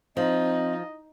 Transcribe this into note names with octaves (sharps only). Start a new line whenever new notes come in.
F3 C4 D#4 D#5